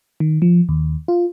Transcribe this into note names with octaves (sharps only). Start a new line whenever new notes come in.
D#3
F3
D#2
F4